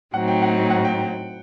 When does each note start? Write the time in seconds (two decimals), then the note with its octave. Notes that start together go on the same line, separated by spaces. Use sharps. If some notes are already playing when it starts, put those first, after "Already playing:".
0.14 A2 F#3 C4 D#4 F#5
0.28 G5
0.42 F#5
0.70 F#5
0.85 G5